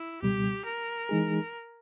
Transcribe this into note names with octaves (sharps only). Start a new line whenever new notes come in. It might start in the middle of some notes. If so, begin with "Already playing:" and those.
Already playing: E4
C#2 B2 G3 G4
A#4
E3 G#3 D#4 G#4